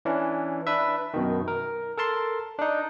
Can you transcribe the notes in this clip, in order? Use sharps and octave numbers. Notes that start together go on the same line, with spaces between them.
E3 C#4 D4
D4 B4 E5
F#2 B2 D#3
A#4
A4 A#4 A5 C6
D4 D#4